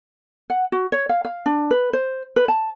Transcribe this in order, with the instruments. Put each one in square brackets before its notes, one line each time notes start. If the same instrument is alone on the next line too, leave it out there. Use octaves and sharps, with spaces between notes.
[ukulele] F#5
F#4
C#5
F5
F5
D4
B4
C5
B4
A5